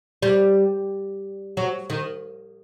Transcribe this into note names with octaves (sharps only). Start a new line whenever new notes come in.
G3
F#3
D#3